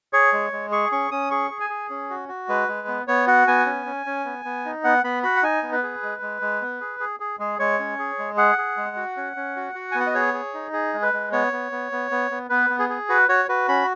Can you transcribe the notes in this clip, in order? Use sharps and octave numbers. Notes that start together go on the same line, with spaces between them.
G#4 C#5
G#3
G#3
G#4 C#6
C#4 C#6
C#4 D#6
G#4 C#6
G#4
G#5
G#4
C#4
F#4
F#4
G#3 B4
G#3
B3
B3 C#5
F#4 F#5
B3 G#5
C#4
C#4
C#4
B3
B3
D#4
B3 F#5
B3 B5
F#4 B5
F#5
D#4 G#5
B3
B4
G#4
G#3
G#3
G#3
B3
G#4
G#4
G#4
G#3 G#4
G#3 C#5
C#4
G#4
G#3
G#4 F#5
G#4
G#3
F#4
C#4
C#4
F#4
F#4
G#5
B3
F#5
D#5
G#4 C#5
G#4
D#4
G#4
G#3
B4
G#3
B3 C#5
B3
B3
B3
B3
B3
B3 B4
B3
G#4
G#4
F#4 B4
F#4 C#5
F#4 B4
C#4 B5